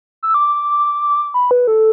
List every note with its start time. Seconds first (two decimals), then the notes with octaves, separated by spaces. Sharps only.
0.23 E6
0.34 D6
1.34 B5
1.51 B4
1.67 A4